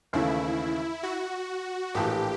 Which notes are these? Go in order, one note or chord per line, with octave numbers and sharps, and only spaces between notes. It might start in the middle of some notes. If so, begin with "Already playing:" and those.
D#2 C#3 E3 A3 E4
F#4
A#1 A2 E3 G4